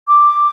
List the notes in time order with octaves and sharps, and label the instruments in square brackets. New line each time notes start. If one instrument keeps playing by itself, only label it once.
[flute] D6